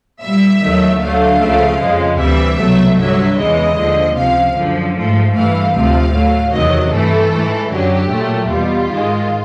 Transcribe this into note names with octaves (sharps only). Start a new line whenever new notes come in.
A#2 G3 E5
D#2 D#3 F#3 A3
D2 D3 F#3 A3 F5
C#2 C#3 F3 A3
F2 C#3 F3 G#3
D2 C3 E3 G3 E5
C2 B2 F#3 A3
G2 D3 F#3 E5
E2 C#3 E3 G#3 D#5
D#2 D3 F3
C#2 C3 F3 F5
F#2 D3 F3
G#2 F3 A3
G2 E3 A3 F5
D2 C3 F3 A3 F5
A2 F#3 A3
E2 C3 D#3 F#3 D#5
G2 E3 A3 A4
G#2 E3 A3
F#2 D3 F#3 G4
A#2 F#3 A3
E2 B2 G3 F4
G#2 D#3 G#3